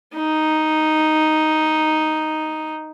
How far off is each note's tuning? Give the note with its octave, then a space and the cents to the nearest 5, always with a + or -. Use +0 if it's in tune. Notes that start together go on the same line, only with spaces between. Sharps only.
D#4 +0